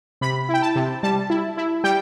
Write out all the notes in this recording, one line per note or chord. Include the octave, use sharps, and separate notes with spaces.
C3 B5
E4 G5
A5
C3
G3 A5
E4
E4
G3 G5